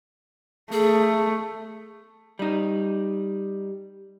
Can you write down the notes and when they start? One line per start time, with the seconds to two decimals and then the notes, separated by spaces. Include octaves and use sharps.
0.72 A3 G#4
2.39 G3 D#4